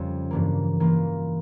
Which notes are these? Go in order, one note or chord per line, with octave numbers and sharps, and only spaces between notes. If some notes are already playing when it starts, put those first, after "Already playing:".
Already playing: F2 C#3 G3 F4
G2 E3 A#3
E3 A#3 F4